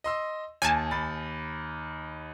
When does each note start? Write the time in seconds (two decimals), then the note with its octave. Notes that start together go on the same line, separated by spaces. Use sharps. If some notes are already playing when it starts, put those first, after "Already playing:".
0.04 D#5 C6 E6
0.62 D#2 G#5 A5
0.91 D#2 B5 A6